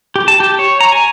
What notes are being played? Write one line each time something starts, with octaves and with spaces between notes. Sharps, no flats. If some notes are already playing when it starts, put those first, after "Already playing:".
G4
A5
G4
C#5
A#5
G#5